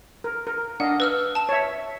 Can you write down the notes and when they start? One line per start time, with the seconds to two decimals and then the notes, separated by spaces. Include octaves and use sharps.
0.24 A#4
0.47 A#4
0.80 D4 D#5 F5 F#5
1.00 B4 E6 F6
1.35 A5 E7
1.49 C#5 E5